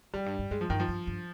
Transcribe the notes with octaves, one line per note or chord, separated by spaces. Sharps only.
F2 G3
G2
G2
G2 G#3
F3
G2 D#3
F3
G2
G2